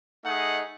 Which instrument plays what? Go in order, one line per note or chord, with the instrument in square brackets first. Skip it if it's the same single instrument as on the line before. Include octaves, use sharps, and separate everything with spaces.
[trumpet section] A3 D#4 G#4 D#5 F#5